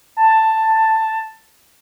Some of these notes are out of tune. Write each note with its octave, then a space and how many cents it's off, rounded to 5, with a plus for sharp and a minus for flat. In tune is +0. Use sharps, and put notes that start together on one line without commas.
A5 +10